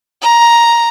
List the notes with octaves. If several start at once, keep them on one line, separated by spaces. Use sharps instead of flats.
A#5